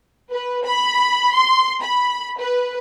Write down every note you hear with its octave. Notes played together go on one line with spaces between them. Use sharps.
B4
B5
C6
B5
B4